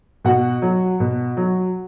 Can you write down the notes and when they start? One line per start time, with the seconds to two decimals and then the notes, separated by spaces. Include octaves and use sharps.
0.25 B2 F#4 F#5
0.62 F#3
1.00 B2
1.37 F#3